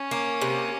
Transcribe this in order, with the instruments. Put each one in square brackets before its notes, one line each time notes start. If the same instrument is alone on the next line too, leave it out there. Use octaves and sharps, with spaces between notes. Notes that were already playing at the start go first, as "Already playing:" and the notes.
Already playing: [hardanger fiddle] C#4
[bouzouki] A#3
C3